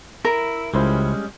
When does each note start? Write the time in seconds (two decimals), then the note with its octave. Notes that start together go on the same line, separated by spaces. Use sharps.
0.25 E4 A#4
0.74 C#2 G3 G#3 C#4 E4 C5